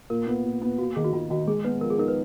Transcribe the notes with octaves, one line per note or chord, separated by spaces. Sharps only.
A#2 A#4
B3
A#2
B3
A#3 F#4
D#3 G#4
F#4
D#3 F4
D#3 F#4
G#3 G#4
B3 B4
F3 A#4
G#4
D#4 A#4
B4